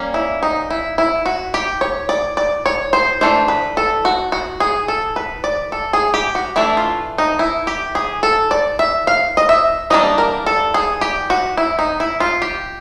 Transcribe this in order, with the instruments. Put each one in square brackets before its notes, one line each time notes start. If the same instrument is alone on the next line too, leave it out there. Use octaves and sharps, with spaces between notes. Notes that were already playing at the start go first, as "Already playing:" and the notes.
Already playing: [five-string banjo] G3 A#3 C#4
E4
D#4
E4
E4
F#4
G4
C#5
D5
D5
C#5
C5
E3 A3 D4 C5
B4
A4
F#4
F#4
G#4
A4
B4
D5
A4
G#4
G4
F#4
E3 A3 D4 E4
F4
D#4
E4
G4
G#4
A4
D5
E5
F5
D#5
E5
E3 G3 A#3 D4 D#5
A#4
A4
G#4
G4
F#4
E4
D#4
E4
F4
G4